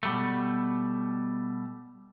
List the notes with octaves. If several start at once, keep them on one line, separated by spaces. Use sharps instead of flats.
B2 G3 A3